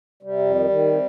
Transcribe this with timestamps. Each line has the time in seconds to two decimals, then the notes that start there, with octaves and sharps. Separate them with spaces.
0.23 C3 G3
0.39 F2
0.55 D#3
0.70 D#3
0.86 C3